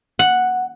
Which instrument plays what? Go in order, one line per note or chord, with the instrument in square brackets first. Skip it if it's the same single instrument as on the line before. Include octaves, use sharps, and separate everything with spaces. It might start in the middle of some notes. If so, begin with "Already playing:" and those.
[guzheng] F#5